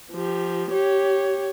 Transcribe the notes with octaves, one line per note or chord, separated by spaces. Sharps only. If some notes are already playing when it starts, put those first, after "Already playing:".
F3 G4
G4 C#5